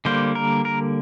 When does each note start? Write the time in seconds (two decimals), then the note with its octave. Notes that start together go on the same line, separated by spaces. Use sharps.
0.05 D3 G3 A#3 C5
0.35 A#4
0.65 A#4